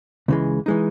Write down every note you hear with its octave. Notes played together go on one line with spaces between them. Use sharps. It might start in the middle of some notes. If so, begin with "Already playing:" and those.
C#2 C#3 E3 G#3
E3 G#3 D#4